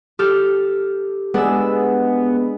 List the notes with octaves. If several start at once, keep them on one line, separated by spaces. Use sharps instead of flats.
G4 A4 F6
G#3 B3 D4 G#4 E6